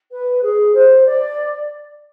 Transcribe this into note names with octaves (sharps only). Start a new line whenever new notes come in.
B4
G#4
C5
D5